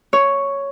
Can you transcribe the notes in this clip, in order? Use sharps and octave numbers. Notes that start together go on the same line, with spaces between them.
C#5